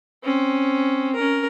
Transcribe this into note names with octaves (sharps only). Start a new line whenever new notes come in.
C4 C#4
C#4 A#4